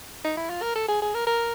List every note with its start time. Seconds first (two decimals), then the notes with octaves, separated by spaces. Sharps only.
0.24 D#4
0.37 E4
0.49 F4
0.62 A#4
0.75 A4
0.88 G#4
1.02 G#4
1.14 A#4
1.27 A#4